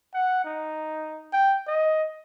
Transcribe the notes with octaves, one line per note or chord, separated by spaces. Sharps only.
F#5
D#4
G5
D#5